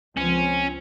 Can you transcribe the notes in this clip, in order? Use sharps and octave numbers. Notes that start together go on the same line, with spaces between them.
C#2 F3 C4 C#4